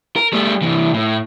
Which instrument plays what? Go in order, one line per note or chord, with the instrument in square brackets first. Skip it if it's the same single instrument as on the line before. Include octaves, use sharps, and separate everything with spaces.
[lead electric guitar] A#4
G3 A3
C2 E3
A2